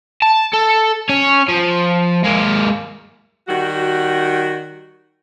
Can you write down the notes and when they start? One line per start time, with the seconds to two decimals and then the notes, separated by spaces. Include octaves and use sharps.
0.22 A5
0.53 A4
1.09 C#4 C#5
1.48 F3
2.24 G#3 A#3
3.48 D#3 G3 F#4